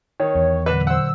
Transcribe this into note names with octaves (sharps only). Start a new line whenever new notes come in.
D#3 C#5
E2
A#2 D3 F#3 B4
C5 F#5 E6